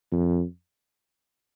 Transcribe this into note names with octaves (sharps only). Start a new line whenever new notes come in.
F2